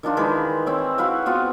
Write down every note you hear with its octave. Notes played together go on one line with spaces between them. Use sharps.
D#3 F3 D4 F4
D#3 E3 G#3 B5
C4 E4 C#5
E4 F#4 B4 F5
B3 C4 F4 F#4